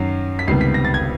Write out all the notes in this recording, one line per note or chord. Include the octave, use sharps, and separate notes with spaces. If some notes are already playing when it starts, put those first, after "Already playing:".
Already playing: F#2 D#3 F#3 C7
B6
C#2 C3 D#3 G3 B3 C7
B6
A#6
A6
G#6